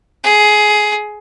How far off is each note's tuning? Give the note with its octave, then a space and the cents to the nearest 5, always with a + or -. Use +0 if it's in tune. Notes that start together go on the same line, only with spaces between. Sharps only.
G#4 +15